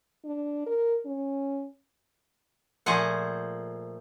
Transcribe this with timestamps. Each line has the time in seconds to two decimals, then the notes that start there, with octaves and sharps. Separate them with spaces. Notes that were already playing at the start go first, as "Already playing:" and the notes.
0.25 D4
0.66 A#4
1.06 C#4
2.86 A#2 F3 A3 G#4 C5 F#5